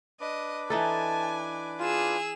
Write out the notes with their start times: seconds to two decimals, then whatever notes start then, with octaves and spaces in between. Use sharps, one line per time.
0.21 D4 B4 D#5 D6
0.70 E3 D#4 A4 G#5 A5
1.80 F4 G#4 E6